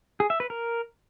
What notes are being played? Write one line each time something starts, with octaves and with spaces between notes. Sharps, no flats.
G#4
E5
B4
A#4